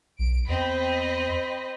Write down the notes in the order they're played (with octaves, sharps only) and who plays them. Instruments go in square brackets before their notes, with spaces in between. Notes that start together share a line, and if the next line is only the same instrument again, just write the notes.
[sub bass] B1 [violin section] D7
[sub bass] E2 [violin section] C4 D#5 B5